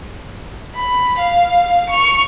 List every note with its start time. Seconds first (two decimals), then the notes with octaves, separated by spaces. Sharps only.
0.76 B5
1.19 F5
1.90 C#6 F7